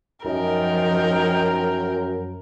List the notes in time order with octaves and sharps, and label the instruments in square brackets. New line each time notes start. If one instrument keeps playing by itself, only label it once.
[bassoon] F#2 [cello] F3 G5 [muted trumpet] D#4 [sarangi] A#4